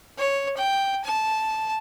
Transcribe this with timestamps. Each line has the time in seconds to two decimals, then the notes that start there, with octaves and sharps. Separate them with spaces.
0.18 C#5
0.57 G5
1.05 A5